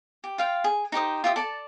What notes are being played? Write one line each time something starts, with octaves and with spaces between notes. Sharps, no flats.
G4
F4 F5 G5
G#4
D#4 G4 C5 D#6
F4 G4 E5 D#6
A4 D5 A5